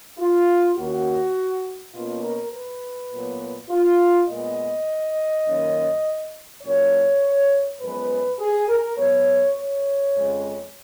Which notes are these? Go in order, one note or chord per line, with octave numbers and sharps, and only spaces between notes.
F4
D#2 D#3 A#3 C#4 F#4
B2 A#3 C#4 F4
A#4
B4
A#2 F#3 B3
F4
A#2 G#3 B3 D#5
F#2 D#3 A#3 C#4
A#2 F#3 C#4 C#5
F#2 F3 G#3 B3 B4
G#4
A#4
G#2 F#3 B3 C#5
C#5
F2 C#3 G#3